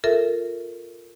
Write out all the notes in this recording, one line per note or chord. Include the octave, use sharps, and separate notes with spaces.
F4 A4 A#4 E5